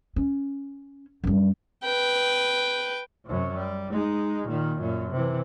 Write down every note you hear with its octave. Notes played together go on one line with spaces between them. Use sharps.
C#4
F#2 G3
B4 G5
F#2 C3
G3
G#3 D#4
A#2 D#3
F#2 A#2
C3 E3